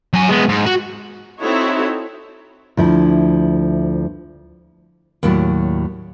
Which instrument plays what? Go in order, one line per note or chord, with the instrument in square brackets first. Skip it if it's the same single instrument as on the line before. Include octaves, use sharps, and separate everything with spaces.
[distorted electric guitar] F#3 G#5
G#3 B3
G#2
F#4
[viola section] C4 D#4 E4 F#4 A4 C#5
[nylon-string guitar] D2 F3 E4
D#2 A2 F#3 E4 D5